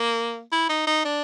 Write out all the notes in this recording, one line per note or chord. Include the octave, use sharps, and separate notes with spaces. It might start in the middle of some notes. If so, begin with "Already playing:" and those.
Already playing: A#3
E4
D#4
D#4
D4